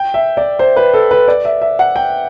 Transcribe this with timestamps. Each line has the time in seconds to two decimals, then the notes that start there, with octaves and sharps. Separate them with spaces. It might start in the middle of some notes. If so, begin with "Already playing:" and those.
Already playing: G5
0.14 E5
0.37 D5
0.59 C5
0.76 B4
0.94 A4
1.11 B4
1.28 D5
1.45 E5
1.62 E5
1.79 F#5
1.96 G5